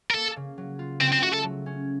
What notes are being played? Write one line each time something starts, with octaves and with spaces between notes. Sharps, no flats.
A#4
A#3 A4
C#3
F#3
F4
C#3 C4
C4
A3 F#4
A4
F#3
C#4